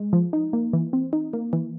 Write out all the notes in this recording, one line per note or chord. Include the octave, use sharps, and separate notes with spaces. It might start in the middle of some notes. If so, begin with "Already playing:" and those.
Already playing: G#3
F3
D#4
A#3
E3
C4
D#4
A#3
E3